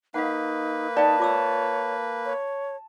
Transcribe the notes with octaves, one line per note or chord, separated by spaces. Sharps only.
A#3 D#4 B4 F5 F#5
D#4 D5 F5 G5 A5
F4 C#5 D6 E6
C#5